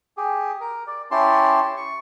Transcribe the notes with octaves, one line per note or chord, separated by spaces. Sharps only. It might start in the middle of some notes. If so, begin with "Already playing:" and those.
G4 G#4
A#4
D5
C#4 E4 G4 A5 C6
C#6